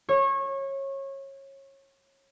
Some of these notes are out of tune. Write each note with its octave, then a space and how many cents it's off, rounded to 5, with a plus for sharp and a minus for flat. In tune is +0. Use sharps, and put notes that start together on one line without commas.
C#5 -25